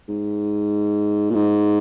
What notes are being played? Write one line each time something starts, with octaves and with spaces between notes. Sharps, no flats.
G#2
A#2
G#2